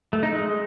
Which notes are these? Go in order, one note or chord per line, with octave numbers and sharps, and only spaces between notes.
A3
D#4
G#3